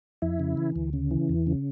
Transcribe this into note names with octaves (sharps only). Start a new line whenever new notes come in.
F2 E4
C#3
E3
D2
C#3
E3
E2
C#3